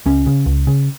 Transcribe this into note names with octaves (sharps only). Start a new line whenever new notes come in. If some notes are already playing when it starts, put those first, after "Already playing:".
C#2 C#4
C#3
C#2
C#3